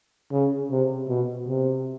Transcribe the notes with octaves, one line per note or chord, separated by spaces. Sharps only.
C#3
C3
B2
C3